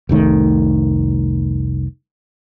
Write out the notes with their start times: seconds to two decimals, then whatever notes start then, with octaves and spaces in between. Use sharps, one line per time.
0.09 F1 C2 D#3 A3